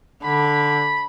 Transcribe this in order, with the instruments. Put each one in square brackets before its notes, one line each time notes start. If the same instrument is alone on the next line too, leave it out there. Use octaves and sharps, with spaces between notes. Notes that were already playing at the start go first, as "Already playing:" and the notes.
[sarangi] D3 [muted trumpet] B5